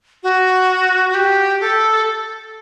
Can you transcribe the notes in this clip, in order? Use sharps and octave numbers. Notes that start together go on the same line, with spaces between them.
F#4
F#4
G4
A4